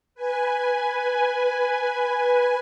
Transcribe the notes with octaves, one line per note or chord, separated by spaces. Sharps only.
B4 G#5